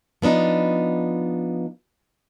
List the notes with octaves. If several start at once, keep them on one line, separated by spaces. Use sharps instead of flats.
F3 B3 D4 D#4